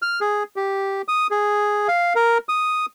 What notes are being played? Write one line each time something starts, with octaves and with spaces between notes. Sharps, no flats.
F6
G#4
G4
D#6
G#4
F5
A#4
D#6